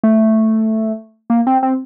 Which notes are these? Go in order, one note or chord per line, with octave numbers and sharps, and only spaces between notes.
A3
A#3
C4
C4